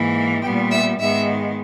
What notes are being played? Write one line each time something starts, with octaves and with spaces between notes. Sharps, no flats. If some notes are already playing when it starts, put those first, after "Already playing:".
Already playing: G#2 E3 A#3
A#2 G3 B3 G5
E5
G#2 D#3 G#3 B3 E5